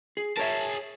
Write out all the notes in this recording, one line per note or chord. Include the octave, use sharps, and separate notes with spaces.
G#4
G#4 A#4 C#5 E5 A5